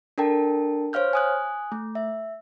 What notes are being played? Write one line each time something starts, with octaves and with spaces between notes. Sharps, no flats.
D4 A4 A#4 G5 A5
C5 C#5 F5 F6 G6
G#5 D#6 F#6
A3
E5